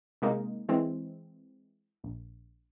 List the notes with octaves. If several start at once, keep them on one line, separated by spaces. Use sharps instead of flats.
C3 G#3 A#3 D#4
E3 G#3 C4
A#1